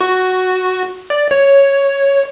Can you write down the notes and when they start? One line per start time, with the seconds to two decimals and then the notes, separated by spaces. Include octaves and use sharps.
0.01 F#4
1.10 D5
1.31 C#5